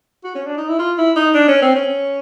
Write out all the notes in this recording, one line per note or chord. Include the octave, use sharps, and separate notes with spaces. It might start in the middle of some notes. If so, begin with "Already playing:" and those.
F#4
C#4
D4
D#4
E4
F4
E4
D#4
D4
C#4
C4
C#4